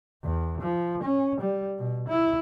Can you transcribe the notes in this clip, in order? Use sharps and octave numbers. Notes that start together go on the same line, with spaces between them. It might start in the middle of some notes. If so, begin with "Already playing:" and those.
E2
F3
C#4
G3
B2
E4